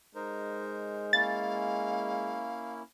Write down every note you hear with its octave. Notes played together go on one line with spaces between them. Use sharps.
G#3 D#4 A#4 C5
A#3 C#4 E4 F5 A6